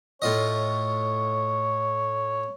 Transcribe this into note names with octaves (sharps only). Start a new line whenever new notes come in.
A2 F4 C#5 D#5